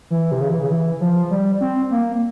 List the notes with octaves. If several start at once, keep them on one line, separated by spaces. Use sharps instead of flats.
E3
C3
C#3
E3
C#3
E3
F3
G3
C4
A#3